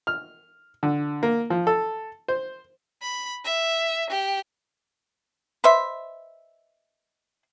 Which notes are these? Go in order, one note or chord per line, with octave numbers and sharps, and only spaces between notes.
F6
D3
A#3
F3
A4
C5
B5
E5
G4
B4 C5 D#5 E5